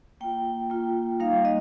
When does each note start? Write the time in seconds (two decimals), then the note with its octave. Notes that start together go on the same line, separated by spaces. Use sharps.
0.21 A#3 F4 G5
0.70 A#3 F4
1.20 G3 A#3 D#4 F5
1.45 D#5